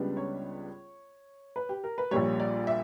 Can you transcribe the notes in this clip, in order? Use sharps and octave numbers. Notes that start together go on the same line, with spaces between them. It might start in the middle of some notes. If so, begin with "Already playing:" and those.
Already playing: C#2 C#3 G3 B3 D4
C#5
B4
G4
A#4
B4
A#1 A#2 G3 C#5
D5
E5